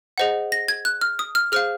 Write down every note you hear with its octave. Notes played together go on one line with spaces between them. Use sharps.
G#4 C5 D#5 F#5
A#6
G#6
F#6
F6
D#6
F6
G#4 C5 F5 F6